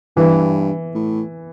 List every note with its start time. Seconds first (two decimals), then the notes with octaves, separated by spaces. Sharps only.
0.17 G2 E3
0.95 A2